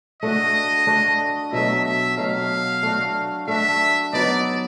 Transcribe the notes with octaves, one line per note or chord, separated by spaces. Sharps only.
A3 D4 F#4 D#5
A3 D4 F#4
B2 F#3 A3 E5
E5
B2 F#3 A3 F5
A3 D4 F#4
A3 D4 F#4 E5
F#3 B3 D#4 D5